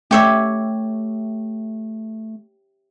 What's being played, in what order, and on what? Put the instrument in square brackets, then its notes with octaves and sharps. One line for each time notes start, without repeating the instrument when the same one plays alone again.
[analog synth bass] A3 [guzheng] G4 C#5 E5